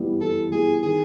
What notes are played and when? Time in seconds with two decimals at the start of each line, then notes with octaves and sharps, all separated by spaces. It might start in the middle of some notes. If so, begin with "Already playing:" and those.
Already playing: E3 G3 B3 E4
0.21 E3 A4
0.52 G3 B3 E4 G#4
0.83 D#3 G#4